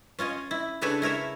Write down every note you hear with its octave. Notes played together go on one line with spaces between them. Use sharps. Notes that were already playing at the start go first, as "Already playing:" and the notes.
C#4 F4 C#5 D#5
E4
C#3 D4 A4 B4 C#5 A5
E4 A#4 C#5 E5